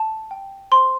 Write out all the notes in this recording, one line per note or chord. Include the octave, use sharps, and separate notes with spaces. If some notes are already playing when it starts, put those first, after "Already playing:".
Already playing: A5
G5
C5 C6